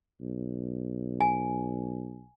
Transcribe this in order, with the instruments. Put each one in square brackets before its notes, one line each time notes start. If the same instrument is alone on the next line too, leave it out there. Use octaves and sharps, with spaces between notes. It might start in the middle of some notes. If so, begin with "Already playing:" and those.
[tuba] B1
[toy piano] G#5